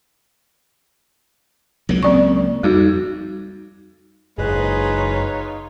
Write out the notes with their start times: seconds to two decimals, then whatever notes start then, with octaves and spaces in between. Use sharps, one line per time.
1.89 C#2 F#3 A#3
2.03 C4 D5 C#6
2.63 F2 G3 D#4 F#4
4.38 F#1 G#3 D#4 F4 B4 C#5